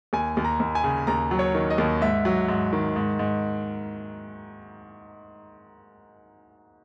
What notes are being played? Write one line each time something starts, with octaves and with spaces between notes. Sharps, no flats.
D#2 G#5
D#2
A#5
D#2
G#5
C#3
D#2 A#5
F#3
C#5
D#3
D#5
D#2
G#2 E5
F#3
G#2
D#3
G#2
G#2